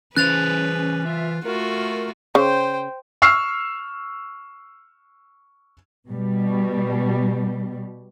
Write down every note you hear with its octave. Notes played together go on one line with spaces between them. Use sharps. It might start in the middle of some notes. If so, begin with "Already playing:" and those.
E3 C#4 G#4 B4 C5 F#6 A6 F7
F4 E5
A3 F4 F#4 A#4
C#3 C5 G5
C#6 E6 F6 C7
B2 G3